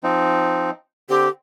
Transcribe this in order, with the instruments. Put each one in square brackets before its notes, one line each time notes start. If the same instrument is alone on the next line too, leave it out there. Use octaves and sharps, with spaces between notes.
[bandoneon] F3 C4 D#4
[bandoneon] D3 C4 [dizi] G4